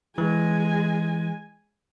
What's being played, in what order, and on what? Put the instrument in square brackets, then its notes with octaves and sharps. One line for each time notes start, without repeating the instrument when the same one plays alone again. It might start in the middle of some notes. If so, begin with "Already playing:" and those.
[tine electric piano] E3 [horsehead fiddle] G#3 G#5